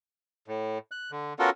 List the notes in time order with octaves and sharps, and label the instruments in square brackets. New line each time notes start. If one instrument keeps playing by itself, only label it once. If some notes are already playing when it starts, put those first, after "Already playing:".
[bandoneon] A2
F#6
D3
B3 C#4 F4 F#4 A4 A#4